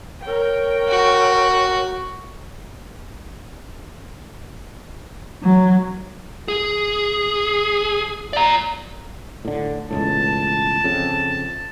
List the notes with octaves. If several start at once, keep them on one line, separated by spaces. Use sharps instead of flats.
A#4 C#5 G5
F#4
F#3
G#4
D5 A#5
A2 D3
E1 C#2 A2 A5
F2 C#3